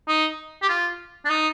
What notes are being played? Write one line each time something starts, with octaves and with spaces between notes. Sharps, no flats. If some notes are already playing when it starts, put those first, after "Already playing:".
D#4
G4
F4
D4
D#4